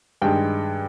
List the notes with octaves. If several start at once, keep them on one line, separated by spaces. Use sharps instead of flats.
G2 D#3 G#3 G5